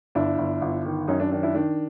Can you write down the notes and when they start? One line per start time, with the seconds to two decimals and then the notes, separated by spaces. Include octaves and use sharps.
0.15 G1 D4 E4
0.38 G1
0.62 G1
0.85 D#3
1.08 F#2 C#4 D#4
1.20 D4
1.32 D#3 D4
1.43 D4 E4
1.55 D#3 D4